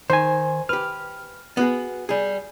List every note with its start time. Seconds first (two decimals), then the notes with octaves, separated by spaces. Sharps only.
0.10 D#3 C5 G#5
0.69 G4 B4 F6
1.57 B3 F#4 G#4
2.09 G3 G#4